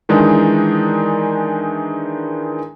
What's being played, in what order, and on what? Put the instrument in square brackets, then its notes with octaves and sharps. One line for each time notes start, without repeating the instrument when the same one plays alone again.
[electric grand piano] D#3 E3 G#3 D4 D#4